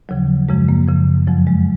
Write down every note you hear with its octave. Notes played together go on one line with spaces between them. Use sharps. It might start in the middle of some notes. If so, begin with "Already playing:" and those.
D#2 C#3 F3 F#3
F#2 C#3 F3 G#3
A#3
F#2 C#3 F3
F2 C#3 F3 F#3
G#3